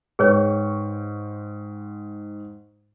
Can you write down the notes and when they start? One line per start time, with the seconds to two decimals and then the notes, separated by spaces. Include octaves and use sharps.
0.19 G#2 G#4 B4 C#5 G5 C#6